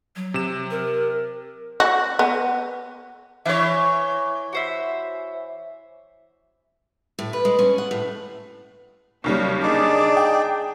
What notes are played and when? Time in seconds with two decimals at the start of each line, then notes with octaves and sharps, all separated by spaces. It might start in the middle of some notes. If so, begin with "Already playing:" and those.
0.16 F#3
0.34 C3 E7
0.71 A#4
1.80 F#4
2.19 B3
3.46 E3 C#5 E5 F#6
4.53 F#4 C5 E5
7.19 A2
7.33 B4
7.45 G#3
7.59 C#4
7.78 F#5
7.91 A2
9.24 D#2 C#3 F#3 G3
9.62 D4 D#4 G#4 D5
10.17 G5